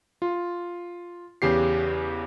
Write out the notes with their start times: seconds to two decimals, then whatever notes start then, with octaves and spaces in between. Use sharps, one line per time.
0.22 F4
1.42 E2 C#3 G4 C7